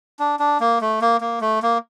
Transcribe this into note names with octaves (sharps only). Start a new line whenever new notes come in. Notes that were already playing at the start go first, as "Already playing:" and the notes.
D4
D4
A#3
A3
A#3
A#3
A3
A#3